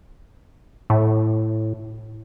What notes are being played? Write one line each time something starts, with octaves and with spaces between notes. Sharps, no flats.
A2